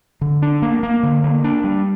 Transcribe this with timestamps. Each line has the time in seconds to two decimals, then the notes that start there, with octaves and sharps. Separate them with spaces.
0.21 D3
0.42 D4
0.62 A#3
0.83 A#3
1.03 D3
1.24 A#3
1.44 D4
1.64 G3